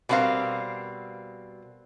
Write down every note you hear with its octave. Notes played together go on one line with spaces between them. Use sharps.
B2 G3 C4 A#4 F5